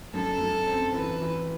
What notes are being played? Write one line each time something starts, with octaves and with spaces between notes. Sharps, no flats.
F#2 A4
F#2
C4
E3 B4
E3